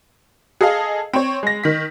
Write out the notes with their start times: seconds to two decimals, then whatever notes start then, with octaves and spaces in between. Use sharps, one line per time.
0.61 G#4 A4 D#5 F5
1.13 C4 C#5
1.43 G#3 A#6
1.64 D#3 B6